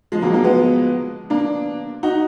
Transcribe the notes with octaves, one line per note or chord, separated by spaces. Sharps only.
F3 G#3
F#3 A#3
F#3 A#3
G#3 B3
A#3 D4
D#4 F#4